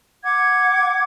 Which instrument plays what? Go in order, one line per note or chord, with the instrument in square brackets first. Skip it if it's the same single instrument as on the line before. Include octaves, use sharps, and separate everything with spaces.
[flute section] F#5 D6 G#6